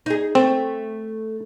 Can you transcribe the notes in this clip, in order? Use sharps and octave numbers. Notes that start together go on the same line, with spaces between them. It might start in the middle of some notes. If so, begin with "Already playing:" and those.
D#4 G#4
A3 C4